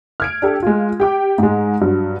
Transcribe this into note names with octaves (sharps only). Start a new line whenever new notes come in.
F6 G#6 D7
D4 G4 A4
G#3 F4
G4 G5 D6
G#2 G#3
G2 F#3